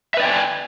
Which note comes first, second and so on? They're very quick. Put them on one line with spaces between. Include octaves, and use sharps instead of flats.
E5 B4 D5 G5 G#5